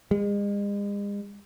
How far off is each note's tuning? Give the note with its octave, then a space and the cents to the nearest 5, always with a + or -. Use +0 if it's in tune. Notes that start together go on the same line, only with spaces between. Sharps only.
G#3 -40